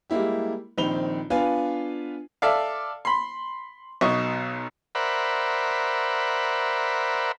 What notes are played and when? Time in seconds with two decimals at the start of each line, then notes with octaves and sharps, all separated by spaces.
0.10 G3 G#3 A#3 E4 G4
0.78 A#1 D#3 C4 B5 F7 G7
1.30 B3 D4 F4 B4 F5 G#5
2.42 A4 D5 E5 F5
3.05 B5 C6
4.01 B1 B2 D#5 C#6
4.95 A#4 C5 D5 E5 F#5 B5